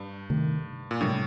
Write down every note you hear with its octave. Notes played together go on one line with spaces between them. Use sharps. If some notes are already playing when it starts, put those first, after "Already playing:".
Already playing: G2
C3 D#3 A3
A#2
A2 C3 G3 D4